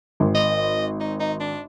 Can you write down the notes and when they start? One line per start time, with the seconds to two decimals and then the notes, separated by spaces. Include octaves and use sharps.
0.20 G#1
0.35 D#5
1.01 D#4
1.20 D#4
1.40 D4